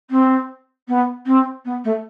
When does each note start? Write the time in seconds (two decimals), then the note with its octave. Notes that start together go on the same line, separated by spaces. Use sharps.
0.10 C4
0.88 B3
1.26 C4
1.65 B3
1.84 A3